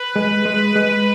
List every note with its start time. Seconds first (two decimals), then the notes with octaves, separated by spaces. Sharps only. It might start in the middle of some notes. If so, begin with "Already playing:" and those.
Already playing: B4
0.16 G#3
0.45 G#3
0.76 G#3